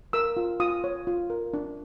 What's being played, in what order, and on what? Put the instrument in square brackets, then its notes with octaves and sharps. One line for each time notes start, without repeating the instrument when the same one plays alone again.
[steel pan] A#4 E6
F4
F4 D#6
C#5
F4
A#4
D4